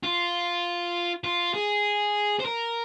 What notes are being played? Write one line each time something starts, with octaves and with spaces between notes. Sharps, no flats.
F4
F4
G#4
C5
A#4